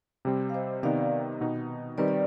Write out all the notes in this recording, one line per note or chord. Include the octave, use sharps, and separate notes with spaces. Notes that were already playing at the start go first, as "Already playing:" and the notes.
C3 G3 C4
F5
C5 D#5
C3 D#3 B3 D#4 D5 F5
B2 B3 D#4
D#3 G3 C4 D#4 B4 D5
D5